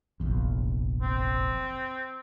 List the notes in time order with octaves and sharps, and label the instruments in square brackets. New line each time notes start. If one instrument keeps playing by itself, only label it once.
[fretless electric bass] F1 A#1 E2
[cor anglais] C4